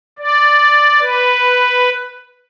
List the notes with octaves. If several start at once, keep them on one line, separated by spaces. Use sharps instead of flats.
D5
B4